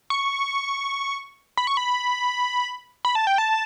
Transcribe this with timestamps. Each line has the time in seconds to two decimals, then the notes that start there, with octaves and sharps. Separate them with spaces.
0.10 C#6
1.57 B5
1.67 C#6
1.77 B5
3.05 B5
3.15 A5
3.27 G5
3.38 A5